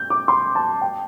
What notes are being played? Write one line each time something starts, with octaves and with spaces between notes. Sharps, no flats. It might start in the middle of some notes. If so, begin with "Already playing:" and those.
Already playing: G6
D6
C6
A5
G5